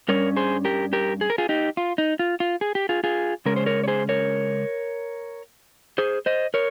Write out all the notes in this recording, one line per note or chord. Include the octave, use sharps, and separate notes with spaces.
G2 G3 C#4 A#4 C#5
G#4 C5
G4 A#4
G4 A#4
G#4
A#4
F4 G#4
D#4 G4
F4
D#4
F4
F4
G#4
G4
F4 G#4
F4 G#4
C#3 G#3 C#4 A#4
C5
A#4 C#5
C#5
G#4 C5
A#4 C#5
G#4 C5
C5 D#5
A#4 C#5